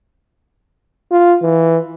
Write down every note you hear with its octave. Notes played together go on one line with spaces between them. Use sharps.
F4
E3